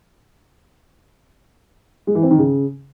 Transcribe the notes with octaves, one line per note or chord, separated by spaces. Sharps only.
G#3
E3
C4
D#3
C#3